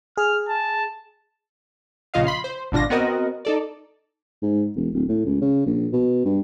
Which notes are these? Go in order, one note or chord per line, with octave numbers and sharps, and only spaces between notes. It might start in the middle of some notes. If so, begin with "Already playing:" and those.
G#4 F6
A5
A#1 C#3 F4 D#5 F5
B5 C6
C5
G#1 B2 D4 F4 A#6
B3 C4 F#4 A#4 D#5
D#4 A4 D5
G#2
E1
D1
A2
C#2
C#3
A#1
B2
G2